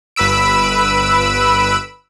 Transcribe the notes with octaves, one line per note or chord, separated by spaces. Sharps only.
G1 B4 B5 E6 D7